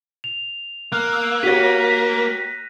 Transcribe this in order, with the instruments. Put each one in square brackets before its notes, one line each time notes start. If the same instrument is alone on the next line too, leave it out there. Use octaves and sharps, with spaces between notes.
[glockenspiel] F7
[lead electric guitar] A#3 [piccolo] F6 [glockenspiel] F#6
[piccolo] E6
[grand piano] F#4 G4 C#5 [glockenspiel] A#6 D#7 [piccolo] B6